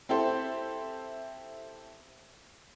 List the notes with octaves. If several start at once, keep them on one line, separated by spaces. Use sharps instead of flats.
C4 E4 G4 A4 C5